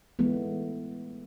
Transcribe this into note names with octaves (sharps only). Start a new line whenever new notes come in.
E3 G#3 A3 B3